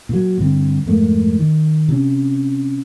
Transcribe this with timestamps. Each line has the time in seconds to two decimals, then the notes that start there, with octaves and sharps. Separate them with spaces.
0.09 A#2 F#3
0.39 G2 D3 C4
0.86 F2 G#2 A3 A#3
1.39 D#3
1.88 C3 C#4